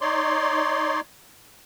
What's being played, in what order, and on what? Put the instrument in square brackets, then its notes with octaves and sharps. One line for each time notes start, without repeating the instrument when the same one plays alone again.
[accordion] D#4 C#5 D5 C6